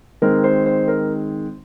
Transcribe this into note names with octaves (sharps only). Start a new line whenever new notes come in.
D#3 G#3 C4 A#4
C5
C5
A#4